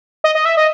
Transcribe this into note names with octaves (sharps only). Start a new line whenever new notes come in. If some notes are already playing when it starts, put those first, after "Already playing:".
D#5
D#5
E5
D#5